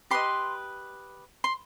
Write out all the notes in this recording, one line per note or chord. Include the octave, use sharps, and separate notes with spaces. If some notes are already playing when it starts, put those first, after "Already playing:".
G4 B4 D#5 C6
C6